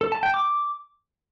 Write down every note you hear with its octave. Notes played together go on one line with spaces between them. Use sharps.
A4
A5
G5
D6